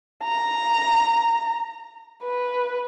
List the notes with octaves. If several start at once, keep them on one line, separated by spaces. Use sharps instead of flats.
A#5
B4